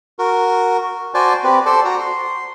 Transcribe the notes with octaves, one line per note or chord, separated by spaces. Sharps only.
F#4 A#4
F#4 C5 D5 G#5 A5
C4 G4 B4
A4 C5 D5 A5
F#4 A#5
C6